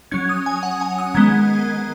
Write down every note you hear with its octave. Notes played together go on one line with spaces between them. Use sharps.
F#3 C#4 G#6
D#6
G#5
F#5
G#5
D#6
D#3 G#3 B3 G#6